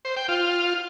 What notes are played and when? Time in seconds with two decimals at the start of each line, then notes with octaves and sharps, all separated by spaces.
0.05 C5
0.17 G5
0.28 F4